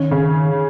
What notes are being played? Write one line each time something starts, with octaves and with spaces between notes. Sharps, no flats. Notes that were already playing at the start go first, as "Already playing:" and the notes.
Already playing: D#3 C#4
C#3